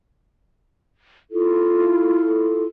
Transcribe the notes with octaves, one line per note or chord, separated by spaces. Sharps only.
E4 F4 A4